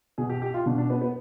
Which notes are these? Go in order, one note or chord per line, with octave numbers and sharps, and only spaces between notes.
B2 G#4
G4
G4
F4
B2 D4
D4
B3
B3